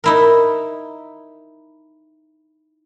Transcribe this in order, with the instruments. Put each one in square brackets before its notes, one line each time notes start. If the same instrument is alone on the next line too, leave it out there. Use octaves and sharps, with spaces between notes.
[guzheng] D#4 E4 A#4